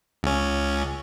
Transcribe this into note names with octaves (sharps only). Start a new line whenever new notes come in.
C#2 C#4